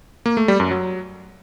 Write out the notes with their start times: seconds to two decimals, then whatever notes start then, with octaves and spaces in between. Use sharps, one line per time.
0.26 A#3
0.37 A3
0.48 G3
0.60 F#2
0.71 F#3